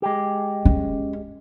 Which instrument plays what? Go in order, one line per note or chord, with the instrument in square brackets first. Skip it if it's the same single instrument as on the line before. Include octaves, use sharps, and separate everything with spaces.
[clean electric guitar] G#3 G4
[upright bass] C#4